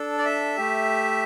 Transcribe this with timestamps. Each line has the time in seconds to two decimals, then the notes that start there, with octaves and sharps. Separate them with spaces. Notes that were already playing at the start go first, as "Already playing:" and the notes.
Already playing: D4 A4
0.18 D5
0.25 E5
0.57 A3 G4